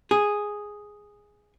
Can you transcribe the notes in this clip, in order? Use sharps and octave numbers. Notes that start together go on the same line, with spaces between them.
G#4